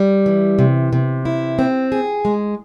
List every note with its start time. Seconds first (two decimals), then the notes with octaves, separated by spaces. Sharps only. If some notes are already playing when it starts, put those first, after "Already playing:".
Already playing: G3
0.26 E3
0.59 C3
0.93 C3
1.25 E4
1.59 C4
1.92 G#4
2.25 G#3